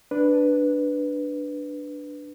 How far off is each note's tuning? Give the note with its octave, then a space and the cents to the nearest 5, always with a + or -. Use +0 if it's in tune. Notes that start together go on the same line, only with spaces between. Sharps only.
D4 +0 B4 +0